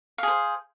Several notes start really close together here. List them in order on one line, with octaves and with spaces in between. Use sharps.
F5 G#4 C5